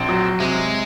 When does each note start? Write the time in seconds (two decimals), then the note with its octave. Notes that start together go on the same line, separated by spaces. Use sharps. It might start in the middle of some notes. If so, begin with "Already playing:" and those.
Already playing: A#1 C4
0.09 F#3
0.40 C3 G#3